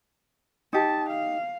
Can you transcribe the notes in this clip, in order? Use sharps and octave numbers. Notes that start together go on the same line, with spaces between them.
D#4 G4 A5
F5